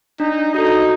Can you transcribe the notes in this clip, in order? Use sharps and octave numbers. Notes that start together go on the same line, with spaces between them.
D4 D#4
D#4 F#4 A4